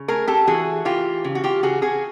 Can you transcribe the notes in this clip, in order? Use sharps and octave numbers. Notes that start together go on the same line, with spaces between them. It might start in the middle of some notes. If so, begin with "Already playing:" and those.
Already playing: C#3
A3 G#4 A#4
G4 A4
E3 F#4 G#4
E3 F4 G4
C#3
F#4
F4 G4
C#3 F#4 G#4
F#4 G#4